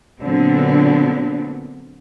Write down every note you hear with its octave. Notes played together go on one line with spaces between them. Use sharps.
A#2 D3 F#3 B3 C4